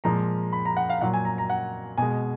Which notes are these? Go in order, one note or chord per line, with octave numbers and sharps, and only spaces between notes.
A#2 F3 G#3 A#5
B5
A#5
F#5
F5
A#2 F#3 F#5
G#5
A#5
A#5
F#5
B2 G#3 G#5